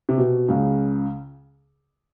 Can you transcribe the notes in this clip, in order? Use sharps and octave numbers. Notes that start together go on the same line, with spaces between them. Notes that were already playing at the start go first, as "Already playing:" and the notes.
C3
B2
C#2 C#3